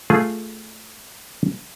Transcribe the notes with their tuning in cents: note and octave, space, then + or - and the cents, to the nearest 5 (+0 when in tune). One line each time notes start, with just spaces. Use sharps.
A3 +0 F4 +0 G#4 -5